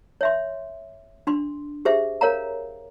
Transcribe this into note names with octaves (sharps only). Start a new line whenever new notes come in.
C#5 E5 C6
D4 C6
G4 G#4 C5 E5
A#4 C#5 F5 A#5